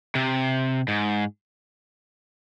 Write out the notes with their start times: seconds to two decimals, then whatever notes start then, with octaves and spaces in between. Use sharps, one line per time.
0.15 C3
0.88 G#2